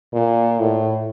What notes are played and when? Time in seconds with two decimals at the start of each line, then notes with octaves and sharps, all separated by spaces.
0.13 A#2
0.60 A2